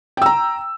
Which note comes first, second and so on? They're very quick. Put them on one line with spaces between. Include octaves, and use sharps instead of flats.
G5 E6 A#5